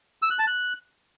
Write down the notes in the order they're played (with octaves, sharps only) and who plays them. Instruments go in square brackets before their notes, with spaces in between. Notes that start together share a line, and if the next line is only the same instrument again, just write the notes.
[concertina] E6
F#6
A5
F#6